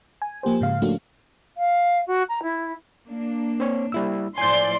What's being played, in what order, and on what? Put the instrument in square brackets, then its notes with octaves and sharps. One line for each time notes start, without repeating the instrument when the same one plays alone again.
[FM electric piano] G#5
F3 A#3 G4 C5
G#2 C#3 F5
F3 A3 A#3 C#4 D4 F#4
[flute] F5
F#4
A#5
E4
[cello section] A#3 D4
[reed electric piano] C4 C#5
G3 E4 E6
[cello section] A2 F3 E4 [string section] D5 C6 [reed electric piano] G#5 G6